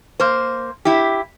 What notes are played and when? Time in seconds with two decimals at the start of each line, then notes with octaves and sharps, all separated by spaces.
0.20 A#3 C5
0.85 E4 G4